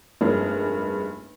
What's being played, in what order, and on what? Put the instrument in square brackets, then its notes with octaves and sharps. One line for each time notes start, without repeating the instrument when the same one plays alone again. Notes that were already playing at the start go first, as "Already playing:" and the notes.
[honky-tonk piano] F1 G2 G#3 A#3 G#4